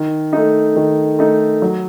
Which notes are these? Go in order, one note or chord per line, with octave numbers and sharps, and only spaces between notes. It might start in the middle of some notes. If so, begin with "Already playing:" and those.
Already playing: D#3
A3 D#4
D#3
A3 D#4
F#3